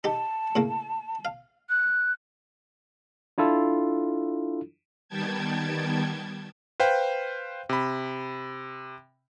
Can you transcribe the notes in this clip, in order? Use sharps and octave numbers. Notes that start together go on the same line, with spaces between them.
D#4 G4 A5
A2 C#3 A#3
F5
F#6
D4 E4 F4 A4
D#3 G3 B3 G5 A5 G#6
B4 C5 F5 G5
C3 B5